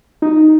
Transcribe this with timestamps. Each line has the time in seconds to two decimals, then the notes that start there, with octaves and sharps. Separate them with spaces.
0.22 D#4